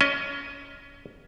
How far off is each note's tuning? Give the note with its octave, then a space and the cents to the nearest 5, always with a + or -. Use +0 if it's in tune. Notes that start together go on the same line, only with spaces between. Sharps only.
C#4 +25 D#5 +0